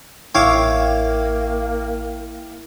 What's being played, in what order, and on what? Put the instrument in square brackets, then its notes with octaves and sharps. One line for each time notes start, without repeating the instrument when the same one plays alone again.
[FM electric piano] A1 G5 [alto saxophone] A#3 [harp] E4 [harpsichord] C#5 F5 D6